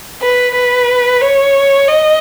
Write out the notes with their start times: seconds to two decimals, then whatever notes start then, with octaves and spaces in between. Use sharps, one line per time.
0.22 B4
0.55 B4
1.22 C#5
1.88 D#5